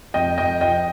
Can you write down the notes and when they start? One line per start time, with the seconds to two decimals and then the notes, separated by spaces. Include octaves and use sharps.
0.14 F2 D#5 G5
0.38 F2 D#5 G5
0.61 F3 D#5 G5